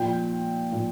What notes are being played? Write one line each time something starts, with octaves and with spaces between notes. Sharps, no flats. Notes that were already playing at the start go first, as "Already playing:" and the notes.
Already playing: A#2 F3 G5
A#2 F3